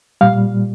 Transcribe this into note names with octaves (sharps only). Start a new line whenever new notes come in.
A#2 G3 F5